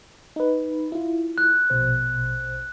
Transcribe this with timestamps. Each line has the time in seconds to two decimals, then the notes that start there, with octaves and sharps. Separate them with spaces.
0.36 D#4 B4
0.92 E4 F4
1.38 F#6
1.70 A#1 B2 C5